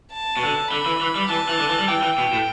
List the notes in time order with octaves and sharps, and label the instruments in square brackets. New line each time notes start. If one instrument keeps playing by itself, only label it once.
[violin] A5
[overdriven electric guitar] B2
D3
[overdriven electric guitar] D3 [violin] B5
[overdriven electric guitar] E3
E3
G3
[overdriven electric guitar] E3 [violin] A5
[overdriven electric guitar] E3
D3
E3
G3
[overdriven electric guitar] E3 [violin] G5
[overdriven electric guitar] E3
B2
A2